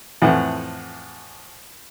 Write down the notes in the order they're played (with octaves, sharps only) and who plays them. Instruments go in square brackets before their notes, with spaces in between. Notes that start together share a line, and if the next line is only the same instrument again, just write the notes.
[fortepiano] F2 A2 E3 F#5